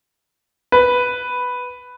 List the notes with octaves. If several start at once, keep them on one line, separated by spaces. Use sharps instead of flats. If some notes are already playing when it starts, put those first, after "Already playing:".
B4